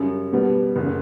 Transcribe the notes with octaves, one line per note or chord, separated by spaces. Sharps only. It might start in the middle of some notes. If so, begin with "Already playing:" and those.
Already playing: F#2 C#3 G3
B2 G3 B3
F#1
C#3